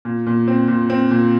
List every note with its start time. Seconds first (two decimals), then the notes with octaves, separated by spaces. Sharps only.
0.05 A#2
0.26 A#2
0.48 C4
0.68 A#2
0.90 C4
1.11 A#2